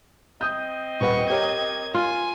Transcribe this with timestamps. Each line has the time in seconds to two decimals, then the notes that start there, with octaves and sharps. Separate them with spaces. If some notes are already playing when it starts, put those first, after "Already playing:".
0.41 C4 D#5 D#6 G6
1.01 D#1 B4 F#5 C#6
1.30 G4 A#4 C#5 G#6
1.94 F4 G#5